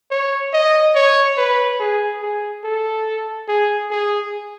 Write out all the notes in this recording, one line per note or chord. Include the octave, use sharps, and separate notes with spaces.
C#5
D#5
C#5
B4
G#4
G#4
A4
G#4
G#4